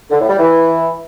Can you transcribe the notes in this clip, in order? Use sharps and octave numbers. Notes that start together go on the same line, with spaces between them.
D3
A2
G3
E3